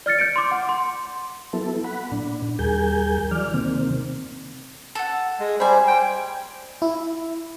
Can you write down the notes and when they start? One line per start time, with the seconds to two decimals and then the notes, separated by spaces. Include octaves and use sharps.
0.06 D5 F6 A6 C#7
0.19 G6 C#7 D7
0.36 C6 D6
0.51 F#5
0.69 C6
1.53 F#3 B3 E4 A4
1.84 F#5 B5
2.12 A#2 D4
2.59 D#2 G3 G#4 A#4 G#5 G6
3.31 E3 F#3 D5 F6
3.54 C3 D#3 A#3 C4
4.95 A4 F#5
5.39 G#3
5.60 G3 C5 G#5 B5
5.87 G5
6.82 E4